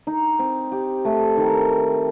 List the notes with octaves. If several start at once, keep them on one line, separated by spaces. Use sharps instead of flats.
D#4
C4
G4
A3
D#3